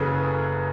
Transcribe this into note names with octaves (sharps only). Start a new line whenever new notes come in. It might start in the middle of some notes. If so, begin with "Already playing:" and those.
Already playing: F#1 F#2 C#3 G#4 A4 B4